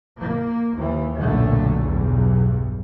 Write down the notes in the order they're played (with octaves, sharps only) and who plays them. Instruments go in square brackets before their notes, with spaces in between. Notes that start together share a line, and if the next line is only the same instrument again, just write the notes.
[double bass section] A#3
D#2 E3
B1 F#2 A#2 D3 A3
B1 E2 G2